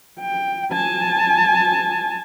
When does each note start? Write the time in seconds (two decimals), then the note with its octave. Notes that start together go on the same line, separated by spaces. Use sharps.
0.20 G5
0.72 G#5 A5